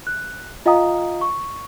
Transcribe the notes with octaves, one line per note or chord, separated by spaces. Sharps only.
F#6
F4 D#5 F5 G5 A#5 D#6
C#6